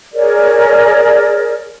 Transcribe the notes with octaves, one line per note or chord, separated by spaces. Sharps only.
G#4 A#4 C#5 D5